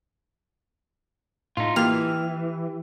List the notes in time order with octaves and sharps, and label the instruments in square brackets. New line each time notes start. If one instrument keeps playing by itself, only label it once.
[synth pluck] A2 [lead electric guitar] D#4 F4
[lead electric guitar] E3 [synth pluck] A#3 F4 [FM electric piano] G4 [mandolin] F6